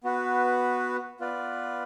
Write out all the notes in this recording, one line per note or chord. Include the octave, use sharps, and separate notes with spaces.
B3 F#4 B4
B3 F4 B4 D5